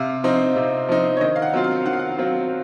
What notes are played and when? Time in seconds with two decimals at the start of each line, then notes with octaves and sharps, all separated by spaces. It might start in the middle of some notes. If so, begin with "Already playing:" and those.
Already playing: C3 F5
0.24 F3 C4 D#4
0.56 C3
0.89 F3 C4 D#4
1.17 C#5
1.21 D#3 D#5
1.36 F5
1.42 F#5
1.53 F#3 C4 F4
1.64 F5
1.86 D#3 F#5
1.93 F5
1.99 F#5
2.18 F#3 C4 F4